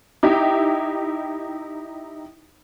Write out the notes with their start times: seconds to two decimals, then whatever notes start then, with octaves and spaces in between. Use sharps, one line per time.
0.23 D#4 E4 G4 E5 G5